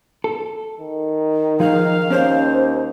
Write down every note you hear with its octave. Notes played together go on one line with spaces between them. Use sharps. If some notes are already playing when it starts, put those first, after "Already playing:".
A4
D#3
F3 D#4 G#4 F5
D#2 C#4 C5 D5